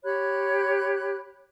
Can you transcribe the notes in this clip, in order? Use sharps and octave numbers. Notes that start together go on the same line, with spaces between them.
G4 C#5 B5 F#6